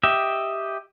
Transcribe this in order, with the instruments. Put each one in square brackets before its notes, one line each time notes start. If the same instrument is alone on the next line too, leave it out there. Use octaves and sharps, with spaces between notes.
[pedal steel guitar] G4 D#5 E5